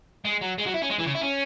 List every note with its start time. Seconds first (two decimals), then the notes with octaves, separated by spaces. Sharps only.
0.25 G#3
0.41 F#3
0.58 G#3
0.66 F#3
0.74 E4
0.82 C#4
0.90 G#3
0.99 E3
1.06 C#3
1.15 E4
1.22 C#4